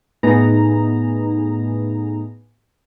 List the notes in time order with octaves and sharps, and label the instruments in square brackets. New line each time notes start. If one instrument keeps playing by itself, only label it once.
[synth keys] A2 A3 B3 D#4 G#4 A#5